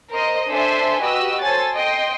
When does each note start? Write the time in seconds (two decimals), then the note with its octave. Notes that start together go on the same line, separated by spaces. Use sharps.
0.11 A#4 C5 D#5
0.49 D4 A4 C5 E5 G#5 C6
1.02 F#4 G4 B4 D#5 E6
1.42 A4 C5 C#5 G#5 A6
1.74 D#5 G5 C6